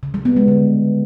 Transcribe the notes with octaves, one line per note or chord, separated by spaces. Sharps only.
C#3
G3
B3
G#3
D3